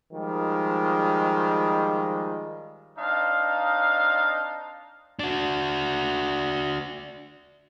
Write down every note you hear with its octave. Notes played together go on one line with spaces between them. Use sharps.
D#3 F3 G3 G#3
C4 D4 D#4 F5
D4 F#4